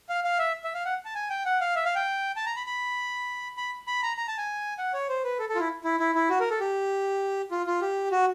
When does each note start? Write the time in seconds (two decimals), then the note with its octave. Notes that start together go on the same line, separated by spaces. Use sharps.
0.09 F5
0.24 F5
0.39 E5
0.64 E5
0.74 F5
0.85 F#5
1.05 A5
1.15 G#5
1.30 G5
1.45 F#5
1.61 F5
1.75 E5
1.85 F5
1.95 G5
2.36 A5
2.46 A#5
2.56 B5
2.66 B5
3.57 B5
3.87 B5
4.03 A#5
4.17 A#5
4.28 A5
4.38 G#5
4.78 F#5
4.94 C#5
5.09 C5
5.24 B4
5.39 A4
5.49 A4
5.55 F4
5.59 E4
5.84 E4
6.00 E4
6.15 E4
6.30 F#4
6.40 A#4
6.50 A4
6.60 G4
7.51 F4
7.66 F4
7.81 G4
8.12 F#4